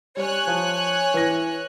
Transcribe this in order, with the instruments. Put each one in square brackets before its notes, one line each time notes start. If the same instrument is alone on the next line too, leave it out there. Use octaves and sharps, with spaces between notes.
[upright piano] G3 [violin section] C#5 G#5 F#6
[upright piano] F3
E3 A#6